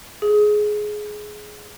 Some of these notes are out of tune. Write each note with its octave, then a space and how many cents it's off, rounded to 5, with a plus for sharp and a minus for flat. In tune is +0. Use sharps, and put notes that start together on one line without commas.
G#4 +15